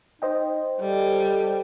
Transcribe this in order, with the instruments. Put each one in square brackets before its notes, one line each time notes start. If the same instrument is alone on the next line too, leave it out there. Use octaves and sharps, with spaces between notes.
[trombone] D#4 [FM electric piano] C5 D#5 G5
[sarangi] G3 [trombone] A4